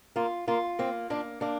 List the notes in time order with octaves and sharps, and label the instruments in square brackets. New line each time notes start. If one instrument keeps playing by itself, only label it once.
[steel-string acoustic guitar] A#3 [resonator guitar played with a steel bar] F4
[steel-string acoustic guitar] A#3 [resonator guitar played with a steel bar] F4
[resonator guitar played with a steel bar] A#3 [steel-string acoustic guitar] C4
[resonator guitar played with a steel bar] A#3 [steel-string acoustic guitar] D4
[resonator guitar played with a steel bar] A#3 [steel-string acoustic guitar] D4